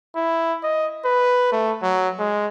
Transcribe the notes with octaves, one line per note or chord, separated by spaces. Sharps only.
E4
D#5
B4
A3
F#3
G#3